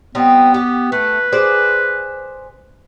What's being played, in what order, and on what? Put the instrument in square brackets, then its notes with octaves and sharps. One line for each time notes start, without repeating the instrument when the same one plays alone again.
[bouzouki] G3 C4 D#4 [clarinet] B3
[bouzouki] G4
[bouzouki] A3 [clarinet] B4
[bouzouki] G#4 C5 D5